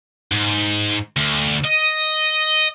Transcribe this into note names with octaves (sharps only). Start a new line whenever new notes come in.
G#2
D2
D#5